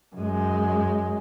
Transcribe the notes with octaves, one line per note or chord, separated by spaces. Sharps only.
F#2 G#3